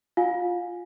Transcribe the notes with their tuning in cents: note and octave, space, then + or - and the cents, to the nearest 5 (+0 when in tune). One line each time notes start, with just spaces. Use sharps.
F4 +0 F5 +30 G#5 -5